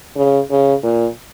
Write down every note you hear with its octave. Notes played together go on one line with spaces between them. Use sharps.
C#3
C#3
A#2